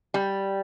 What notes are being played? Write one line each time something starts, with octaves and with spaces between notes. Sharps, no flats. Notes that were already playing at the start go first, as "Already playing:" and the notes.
G3